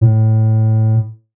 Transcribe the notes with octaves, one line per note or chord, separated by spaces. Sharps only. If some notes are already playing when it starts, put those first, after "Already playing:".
A2